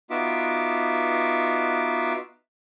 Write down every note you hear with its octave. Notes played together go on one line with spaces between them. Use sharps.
B3 D#4 F4 F#4 E5 D6